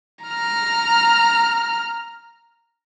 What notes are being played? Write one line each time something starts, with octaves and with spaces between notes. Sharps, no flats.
A#5 F6